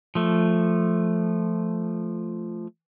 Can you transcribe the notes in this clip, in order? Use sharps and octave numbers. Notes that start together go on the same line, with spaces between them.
F3 A3